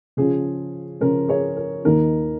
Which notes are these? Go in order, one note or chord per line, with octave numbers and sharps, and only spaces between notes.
C#3 F3 C#4 F4 G#4
C#3 F3 C#4 F4 A#4
G#4 C#5
A#4
D#2 D#3 A#3 D#4 A#4